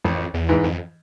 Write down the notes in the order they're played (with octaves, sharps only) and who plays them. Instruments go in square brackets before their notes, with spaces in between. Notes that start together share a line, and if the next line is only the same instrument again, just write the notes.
[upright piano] A1 [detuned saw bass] F2
[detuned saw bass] E2
[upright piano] G#2 E3
[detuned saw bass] F2